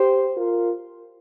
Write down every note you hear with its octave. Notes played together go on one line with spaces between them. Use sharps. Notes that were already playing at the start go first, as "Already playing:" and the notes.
Already playing: G4 C5
F4 A#4